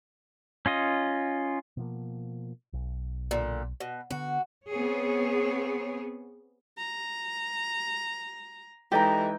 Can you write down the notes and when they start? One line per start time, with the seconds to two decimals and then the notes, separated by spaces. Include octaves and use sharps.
0.66 C#4 F4 D#5
1.77 B2 F3 A#3
2.73 B1
3.31 A#2 D3
3.80 B2
4.11 D3 B3 F#4
4.69 B3 C4 G#4 C#5
6.78 A#5
8.92 E3 G#3 D#4 G4 A4 D#5 G5